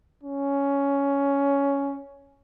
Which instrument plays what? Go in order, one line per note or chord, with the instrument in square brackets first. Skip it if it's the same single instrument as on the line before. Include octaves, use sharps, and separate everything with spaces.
[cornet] C#4